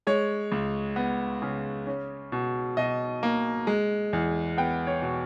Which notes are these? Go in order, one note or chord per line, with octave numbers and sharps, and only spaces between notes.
G#3 C#5
C#2
B3
C#3
C#4
B2
B2 D#5
A#3
G#3
E2
B3 G5
C#5
B2